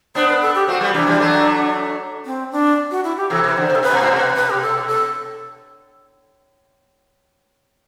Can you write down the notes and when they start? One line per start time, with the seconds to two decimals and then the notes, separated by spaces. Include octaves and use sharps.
0.15 B3 D4 C5
0.29 B4
0.42 A4
0.55 G4
0.68 A3 C4 F#4
0.81 G3 B3
0.94 C3 E3 D4
1.07 E3 G3
1.20 F#3 A3
2.25 C4
2.52 D4
2.91 F#4
3.04 E4
3.17 G4
3.30 C3 E3 A4
3.44 C3 E3
3.49 B4
3.57 D3 C5
3.70 C3
3.75 A4
3.83 C3 B4
3.92 B2
4.00 A2 C5
4.11 B2
4.18 B4
4.35 B4
4.50 G4
4.62 A4
4.88 A4